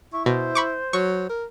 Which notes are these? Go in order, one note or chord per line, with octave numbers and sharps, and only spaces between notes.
E4 C#6
B2 C5
B5 C#6 D6
F#3 C#6
A#4